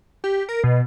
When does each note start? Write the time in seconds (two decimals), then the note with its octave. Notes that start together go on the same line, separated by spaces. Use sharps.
0.24 G4
0.49 A#4
0.64 B2